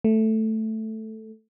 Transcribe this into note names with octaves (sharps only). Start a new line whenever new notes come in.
A3